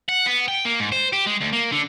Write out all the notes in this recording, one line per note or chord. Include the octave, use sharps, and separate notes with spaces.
F#5
B3
G5
A#3
G#2
C5
G4
G#3
D2
A#3
D3